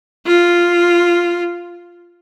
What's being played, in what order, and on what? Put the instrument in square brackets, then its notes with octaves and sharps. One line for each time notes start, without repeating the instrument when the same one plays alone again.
[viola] F4